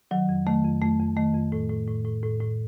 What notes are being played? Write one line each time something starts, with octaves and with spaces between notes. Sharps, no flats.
D#3 F#3
F2
D#3 A3
F2
F2 A3
F2
D#3 A3
F2
A2
A2
A2
A2
A2
A2